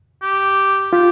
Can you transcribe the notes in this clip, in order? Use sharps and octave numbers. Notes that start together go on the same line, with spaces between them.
G4
F4 G4